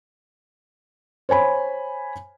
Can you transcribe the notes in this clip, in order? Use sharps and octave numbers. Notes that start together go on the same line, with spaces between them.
C5 C#5 G#5 B5